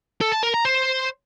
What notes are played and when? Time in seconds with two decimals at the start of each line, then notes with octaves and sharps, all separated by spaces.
0.21 A4
0.32 A5
0.43 A#4
0.54 A#5
0.65 C5